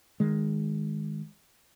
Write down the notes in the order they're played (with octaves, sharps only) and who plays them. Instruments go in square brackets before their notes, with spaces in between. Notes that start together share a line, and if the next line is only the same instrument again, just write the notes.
[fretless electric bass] D#3 G#3